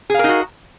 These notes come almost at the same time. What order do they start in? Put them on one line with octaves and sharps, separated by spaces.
G#4 F5 A#4 D#4 F#4